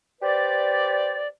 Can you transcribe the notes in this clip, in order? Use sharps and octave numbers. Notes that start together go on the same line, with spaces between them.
G4 B4 C5 D5